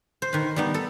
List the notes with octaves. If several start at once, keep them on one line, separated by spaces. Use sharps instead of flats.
C5
D#3 B4
G3 B3 D#4
A4